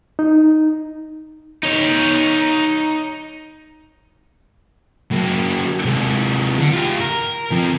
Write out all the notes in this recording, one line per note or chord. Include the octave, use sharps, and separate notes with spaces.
D#4
D#4 C#5
F#3 A#3
C3 G#3
D3
F4 G4
A#4
F3 C4